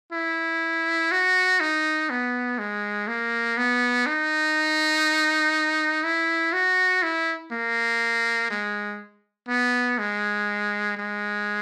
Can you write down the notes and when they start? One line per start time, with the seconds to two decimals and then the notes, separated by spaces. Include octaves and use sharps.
0.12 E4
1.12 F#4
1.60 D#4
2.10 B3
2.58 G#3
3.08 A#3
3.57 B3
4.06 D#4
6.04 E4
6.53 F#4
7.03 E4
7.52 A#3
8.51 G#3
9.48 B3
9.98 G#3
10.97 G#3